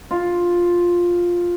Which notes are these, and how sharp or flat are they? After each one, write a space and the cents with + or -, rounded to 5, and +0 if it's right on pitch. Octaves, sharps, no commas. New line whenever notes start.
F4 +5